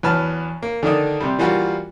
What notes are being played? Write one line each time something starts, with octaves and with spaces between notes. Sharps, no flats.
E2 F#3 B4 A5 F6
A#3
D3 D#3 D4 D#4
C3 G3
E3 G3 A#3 F4 F#4